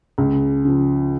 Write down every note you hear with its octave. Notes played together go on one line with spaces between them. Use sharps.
C#2
C#3 F3